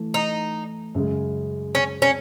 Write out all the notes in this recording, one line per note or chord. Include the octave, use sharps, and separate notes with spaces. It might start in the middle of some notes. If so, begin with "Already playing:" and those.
Already playing: E3 A3
D#4
F#2 C#3 G#3
C#4
C#4